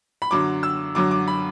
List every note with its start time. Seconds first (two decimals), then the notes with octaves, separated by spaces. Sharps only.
0.22 B5
0.31 F#2 D3 F#3 D6
0.63 E6
0.95 F#2 D3 F#3 D6
1.11 D6
1.28 B5